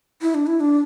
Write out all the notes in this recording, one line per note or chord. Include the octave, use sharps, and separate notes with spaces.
E4
D4
E4
D4